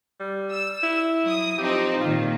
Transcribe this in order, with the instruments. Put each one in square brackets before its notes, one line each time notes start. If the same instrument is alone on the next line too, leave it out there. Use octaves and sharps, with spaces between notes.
[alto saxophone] G3
[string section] E6
[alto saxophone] E4
[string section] F#3 D#6
[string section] F3 C4 D#4 [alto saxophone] G4
[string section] A#2 D#3 [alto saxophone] F4